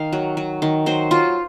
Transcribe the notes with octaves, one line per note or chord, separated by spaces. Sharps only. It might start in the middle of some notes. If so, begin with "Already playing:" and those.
Already playing: D#3 F5
F#3
F#3
D#3
F#3 C5
F#3 F4